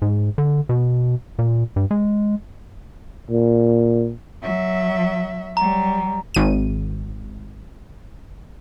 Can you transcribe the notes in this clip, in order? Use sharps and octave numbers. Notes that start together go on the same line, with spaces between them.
G#2
D3
B2
A#2
G2
G#3
A#2
F#3 E5
F#3 G3 A#5
G#1 D#7